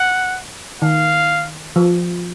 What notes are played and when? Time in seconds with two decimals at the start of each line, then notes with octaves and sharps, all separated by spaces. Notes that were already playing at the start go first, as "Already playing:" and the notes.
Already playing: F#5
0.81 D#3 F5
1.76 F3